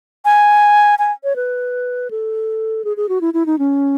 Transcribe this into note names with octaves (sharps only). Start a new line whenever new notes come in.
G#5
G#5
C#5
B4
A4
G#4
G#4
F#4
E4
E4
D#4
C#4